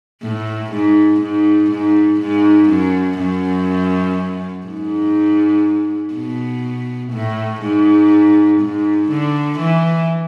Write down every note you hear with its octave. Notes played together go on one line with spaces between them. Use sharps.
A2
G#2
G#2
G#2
G#2
F#2
F#2
G#2
B2
A2
G#2
G#2
D3
E3